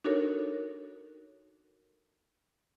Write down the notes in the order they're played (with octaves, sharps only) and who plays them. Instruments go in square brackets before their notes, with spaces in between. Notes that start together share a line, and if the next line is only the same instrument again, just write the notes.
[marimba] D4 D#4 F#4 A4 A#4 C#5